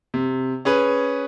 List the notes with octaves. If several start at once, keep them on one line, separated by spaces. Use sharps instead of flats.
C3
C#4 G#4 B4